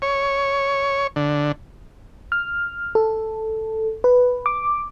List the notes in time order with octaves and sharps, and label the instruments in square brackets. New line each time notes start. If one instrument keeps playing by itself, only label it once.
[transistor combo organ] C#5
D3
[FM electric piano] F6
A4
B4
D6